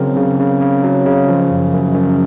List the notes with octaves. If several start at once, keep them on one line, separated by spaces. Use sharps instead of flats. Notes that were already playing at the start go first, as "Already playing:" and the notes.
Already playing: C#3 F#3 C4 A#4
C#3
C#3
C#3
F#3
C#3
F3
F#2
F#2
F#2